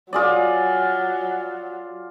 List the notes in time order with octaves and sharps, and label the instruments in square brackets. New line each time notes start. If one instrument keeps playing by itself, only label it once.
[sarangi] F#3 [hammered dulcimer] F4 G#4 D5